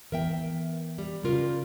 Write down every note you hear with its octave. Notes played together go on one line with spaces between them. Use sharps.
E3 B3 A#4 E5 G5
G3
C#3 G3 F4 A#4